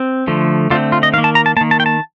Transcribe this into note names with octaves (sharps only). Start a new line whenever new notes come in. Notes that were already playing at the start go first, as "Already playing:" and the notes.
Already playing: C4
D3 F3 A3
D3 A3 C4 F4
F4
D#5
D#3 A#3 F5
A5
A#5
A5
D#3 A#3 A5
A5
G5
A5